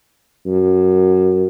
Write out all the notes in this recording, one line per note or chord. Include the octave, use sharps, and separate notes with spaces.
F#2